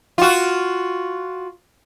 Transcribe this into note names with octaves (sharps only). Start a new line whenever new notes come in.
F4 F#4